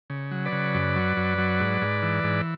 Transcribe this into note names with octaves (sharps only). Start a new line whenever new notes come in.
C#3
F#3
B4 D5
C#3
F#2
F#3
F#2
F#3
G#2
G#2
E3
G#2